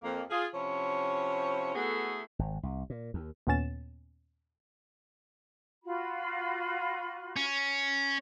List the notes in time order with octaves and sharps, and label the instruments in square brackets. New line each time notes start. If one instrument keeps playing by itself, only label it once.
[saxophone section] F2 A#3
F4 G#4
C3 F3 C#4 E4 C#5
A3 B3 E4 F#4 G#4 A4
[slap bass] G#1
C2
A#2
D#2
[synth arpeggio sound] D#2 A#2 B3 C#4 A6 E7
[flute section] F4 F#4 B5
[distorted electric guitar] C#4